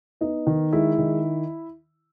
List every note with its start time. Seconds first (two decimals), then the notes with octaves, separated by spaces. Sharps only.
0.21 B3 D#4
0.47 D#3
0.73 G#3 E4
0.98 D#3